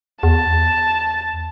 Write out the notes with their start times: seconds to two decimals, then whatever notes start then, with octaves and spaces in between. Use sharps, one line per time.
0.23 E2 A5